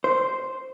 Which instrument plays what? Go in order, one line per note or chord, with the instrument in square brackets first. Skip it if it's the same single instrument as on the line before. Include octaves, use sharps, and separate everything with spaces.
[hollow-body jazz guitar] C5